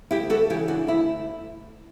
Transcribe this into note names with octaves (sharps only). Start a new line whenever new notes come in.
D2 E4 G4
F#4 A4
C#3 E3 E4 G4
D4 F#4
D2 E4